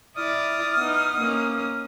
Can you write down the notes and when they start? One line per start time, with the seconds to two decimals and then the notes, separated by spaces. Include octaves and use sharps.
0.16 E4 D5 D#6 F6
0.77 B3 D#4
1.20 A#3 C#4